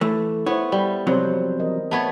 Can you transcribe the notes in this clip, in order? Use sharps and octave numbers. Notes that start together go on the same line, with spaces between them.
E3 A3
B3 E4 A4 C5 C#5
G3
F2 C3 F#3 C4 C5
E3 A#4 D#5
A3 B3 C#5